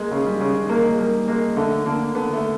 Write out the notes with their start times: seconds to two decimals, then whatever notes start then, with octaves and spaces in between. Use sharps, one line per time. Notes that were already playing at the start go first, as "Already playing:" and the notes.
Already playing: G#3 A#3
0.11 C#3
0.26 G3
0.40 C#3
0.69 G#3 A#3
0.87 G#3
0.99 G3 A#3
1.28 G#3 A#3
1.56 D3 A3
1.86 D3 A#3
2.15 D3 B3
2.33 A3